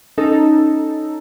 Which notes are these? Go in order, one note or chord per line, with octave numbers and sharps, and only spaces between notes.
C#4 D#4 A4